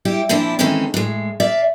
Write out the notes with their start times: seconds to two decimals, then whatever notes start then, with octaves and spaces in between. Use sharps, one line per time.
0.05 G3 E4 G4
0.29 A#2 F3 C4 D4 E4
0.59 D#3 E3 G#3 C4 C#4 A4
0.94 A2 G#3
1.40 D5 E5 F5